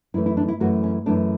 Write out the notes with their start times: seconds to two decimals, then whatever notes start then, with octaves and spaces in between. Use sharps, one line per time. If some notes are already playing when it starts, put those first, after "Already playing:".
0.14 F#2 E3 A3 E4
0.26 E4
0.37 D4
0.48 E4
0.60 F#2 E3 A3 F#4
0.83 C#4
1.06 F#2 E3 A3 D4